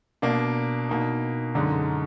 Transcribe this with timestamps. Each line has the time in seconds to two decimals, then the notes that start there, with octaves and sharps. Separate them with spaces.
0.22 B2 A#3 D4
0.89 B2 A#3 D#4
1.55 F#2 D3 G#3 D#4